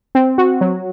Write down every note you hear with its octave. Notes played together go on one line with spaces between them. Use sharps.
C4
F#4
F#3